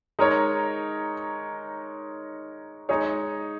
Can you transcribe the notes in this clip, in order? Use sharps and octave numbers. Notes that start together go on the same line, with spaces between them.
G#3 D#4 A#4 C#5
G#3 D#4 G#4 C#5